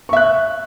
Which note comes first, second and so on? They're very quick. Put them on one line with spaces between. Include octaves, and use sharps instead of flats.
C#6 E5 F#6